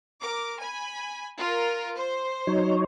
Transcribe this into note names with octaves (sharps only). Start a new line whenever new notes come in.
A#4 D6
G#5 B5
F4 A#4
C5
F#3 D#4 C#5